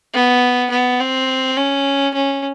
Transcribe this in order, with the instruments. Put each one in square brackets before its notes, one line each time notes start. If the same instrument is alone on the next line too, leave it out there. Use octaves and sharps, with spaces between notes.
[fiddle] B3
B3
C4
C#4
C#4